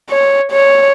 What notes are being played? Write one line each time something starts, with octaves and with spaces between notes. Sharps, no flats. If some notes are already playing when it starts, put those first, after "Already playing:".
C#5
C#5